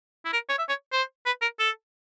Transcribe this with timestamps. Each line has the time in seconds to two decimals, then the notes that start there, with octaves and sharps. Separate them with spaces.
0.25 E4
0.33 A#4
0.49 C#5
0.59 E5
0.69 C#5
0.92 C5
1.26 B4
1.42 A#4
1.59 A4